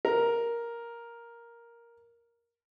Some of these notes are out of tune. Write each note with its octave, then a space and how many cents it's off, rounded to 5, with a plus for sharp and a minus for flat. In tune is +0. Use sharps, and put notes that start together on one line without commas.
A#4 +5